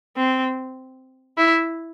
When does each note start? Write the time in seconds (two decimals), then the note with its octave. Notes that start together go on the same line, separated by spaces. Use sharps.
0.17 C4
1.38 E4